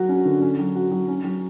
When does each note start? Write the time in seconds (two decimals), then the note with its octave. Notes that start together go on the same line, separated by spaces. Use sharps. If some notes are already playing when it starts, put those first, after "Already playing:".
Already playing: F#3 F#4
0.09 C#4
0.25 D3
0.41 C#4
0.59 F#3
0.75 F#4
0.91 F#3
1.08 C#4
1.24 F#3